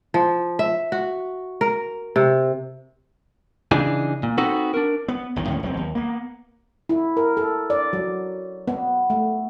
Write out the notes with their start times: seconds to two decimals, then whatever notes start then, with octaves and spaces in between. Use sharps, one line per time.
0.14 F3
0.59 E5
0.92 F#4
1.61 A#4
2.16 C3
3.71 C#3 E3 D4 D#4 G#4
4.23 A#2
4.38 B3 C4 D#4 F#4 A4 B4
4.74 D4 A#4
5.08 B3
5.36 B1 E2 A2 D#3
5.48 D#2 A2 D3 C#4
5.63 E1 F#3 C4
5.77 D#2
5.95 A#3 B3
6.89 E4
7.17 A#4
7.37 A4
7.70 D5
7.93 F#3
8.68 B3
9.10 A3